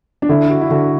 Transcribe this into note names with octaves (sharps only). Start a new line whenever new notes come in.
D4
D3 E4
F#4
E4
D3 F#4